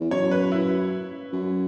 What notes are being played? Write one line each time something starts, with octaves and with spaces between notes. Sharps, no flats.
E2
F#2 C#5
B4
E4
F#2